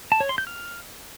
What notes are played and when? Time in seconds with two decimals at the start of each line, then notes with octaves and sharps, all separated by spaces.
0.12 A5
0.20 C#5
0.29 C6
0.38 G6
0.47 F6